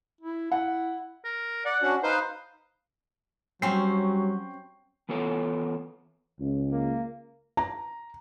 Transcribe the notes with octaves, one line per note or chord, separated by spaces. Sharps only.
E4
E4 F#5
A#4
D5 F#5
C#4 D4 F#4
D#4 B4 C5 F5
F#3 G3 C4 C#4 G5 C7
E3 B3 F4 A4 C#5
C#2
A#3
A#5